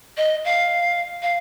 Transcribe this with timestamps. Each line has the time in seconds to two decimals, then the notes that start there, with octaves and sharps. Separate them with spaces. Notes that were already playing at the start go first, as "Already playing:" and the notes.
0.17 D#5
0.44 F5
1.22 F5